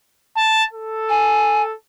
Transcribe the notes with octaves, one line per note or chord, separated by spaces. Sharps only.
A5
A4
G#5